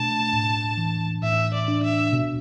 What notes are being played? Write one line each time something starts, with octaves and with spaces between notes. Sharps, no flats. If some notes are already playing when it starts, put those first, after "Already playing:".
Already playing: B2 A3 D4 A5
A2
E3
A2 E5
D5
D4
E5
B2